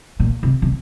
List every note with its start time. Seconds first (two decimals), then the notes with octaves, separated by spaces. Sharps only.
0.20 A#2
0.43 C3
0.62 C3